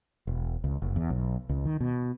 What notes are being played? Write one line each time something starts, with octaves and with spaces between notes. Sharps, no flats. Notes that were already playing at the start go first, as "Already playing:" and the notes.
E1
C#2
F#1
E2
B1
C#2
D#3
B2